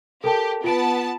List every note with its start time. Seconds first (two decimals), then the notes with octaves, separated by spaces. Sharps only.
0.24 G4 A4 A#4 A5
0.64 B3 F4 A5 D7